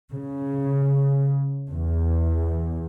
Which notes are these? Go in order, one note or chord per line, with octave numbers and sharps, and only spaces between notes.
C#3
E2